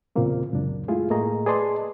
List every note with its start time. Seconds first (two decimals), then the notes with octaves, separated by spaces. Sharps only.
0.16 E2 A#2 C#3 E3 A#3 C4
0.53 C#2 F#2 D4
0.88 G#3 A3 E4 F4 G#4
1.10 A2 A3 A#3 G#4 D#5 A#5
1.46 G#4 B4 D5 D#5 A5 C6